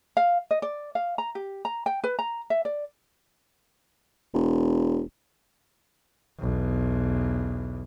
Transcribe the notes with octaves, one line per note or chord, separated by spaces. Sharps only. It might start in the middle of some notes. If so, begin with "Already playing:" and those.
F5
D#5
D5
F5
A#5
G4
A#5
G5
B4
A#5
E5
D5
E1
B1 E2